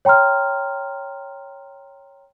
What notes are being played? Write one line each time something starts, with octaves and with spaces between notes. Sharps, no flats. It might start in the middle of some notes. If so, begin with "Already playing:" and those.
C#5 G5 A#5 C6 F6